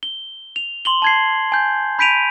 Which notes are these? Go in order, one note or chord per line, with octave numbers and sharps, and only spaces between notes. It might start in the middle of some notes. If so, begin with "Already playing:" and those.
G7
F7
C6 F#7 G7
A5 G#6 C7
G#5 G6
B5 G6 B6 D7 D#7 F7